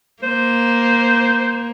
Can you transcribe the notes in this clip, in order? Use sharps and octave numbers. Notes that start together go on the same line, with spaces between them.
A#3 C5